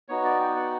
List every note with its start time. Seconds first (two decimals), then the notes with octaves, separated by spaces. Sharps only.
0.08 B3 D#4 F#4 C#5
0.24 D5
0.40 G5
0.56 F#5